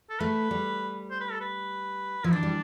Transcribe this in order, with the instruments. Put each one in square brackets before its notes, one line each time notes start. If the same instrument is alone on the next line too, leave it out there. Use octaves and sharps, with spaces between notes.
[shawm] A4
[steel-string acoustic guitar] A3 [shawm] B4
[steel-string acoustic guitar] G3
[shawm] C5
B4
A4
B4
[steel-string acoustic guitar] F3 [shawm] E4
[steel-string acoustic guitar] E3 [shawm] D4
[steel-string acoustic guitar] G3